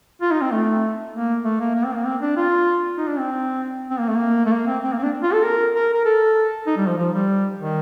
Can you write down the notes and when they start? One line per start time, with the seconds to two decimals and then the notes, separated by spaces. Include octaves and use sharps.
0.22 F4
0.31 D#4
0.41 C4
0.52 A3
1.14 A#3
1.45 A3
1.60 A#3
1.75 A#3
1.85 C4
1.95 A#3
2.06 C4
2.22 D4
2.37 F4
2.98 D#4
3.08 D4
3.19 C4
3.90 C4
3.99 A#3
4.09 A3
4.17 A#3
4.46 A3
4.52 A#3
4.67 C4
4.83 C4
4.93 A#3
4.99 C4
5.03 D4
5.23 F4
5.33 A4
5.44 A#4
5.75 A#4
5.94 A#4
6.05 A4
6.67 D#4
6.77 G3
6.87 F3
6.98 F3
7.13 G3
7.60 D#3